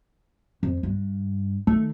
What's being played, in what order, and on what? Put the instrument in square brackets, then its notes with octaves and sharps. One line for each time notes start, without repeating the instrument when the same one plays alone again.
[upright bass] F2
G2
[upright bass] D#3 [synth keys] A3